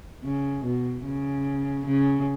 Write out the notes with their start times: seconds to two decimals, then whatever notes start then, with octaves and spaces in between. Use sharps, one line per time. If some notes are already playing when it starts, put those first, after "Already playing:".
0.24 C#3
0.64 B2
1.04 C#3
1.86 C#3